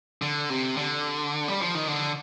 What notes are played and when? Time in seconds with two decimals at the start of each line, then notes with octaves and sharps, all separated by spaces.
0.22 D3
0.50 C3
0.77 D3
1.48 G3
1.62 F3
1.75 D#3
1.87 D3